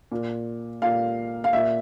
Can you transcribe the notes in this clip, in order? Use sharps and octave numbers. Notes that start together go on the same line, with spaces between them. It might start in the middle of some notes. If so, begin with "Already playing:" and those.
A#2
A#2 F5
F5
A#2 E5